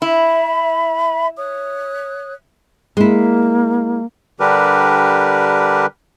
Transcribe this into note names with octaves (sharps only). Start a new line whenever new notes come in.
E4 E5 B5
C#5 D#6 F#6
G#3 A#3 E4
D3 G3 D4 G4 A#4 B4